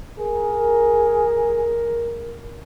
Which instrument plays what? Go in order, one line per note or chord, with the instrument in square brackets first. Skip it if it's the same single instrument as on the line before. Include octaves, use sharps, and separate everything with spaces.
[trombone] G#4 [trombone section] A#4